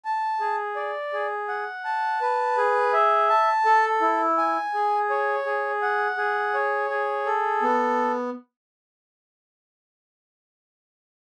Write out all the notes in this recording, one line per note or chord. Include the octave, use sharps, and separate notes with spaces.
A5
G#4
D5
G#4
F#5
A5
B4
G#4
E5
A5
A4
E4
G#5
G#4
C#5
G#4
F#5
G#4
C#5
G#4
A4
B3